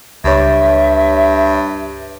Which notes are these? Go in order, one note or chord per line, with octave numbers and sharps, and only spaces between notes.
C#2 G2 C#5 E5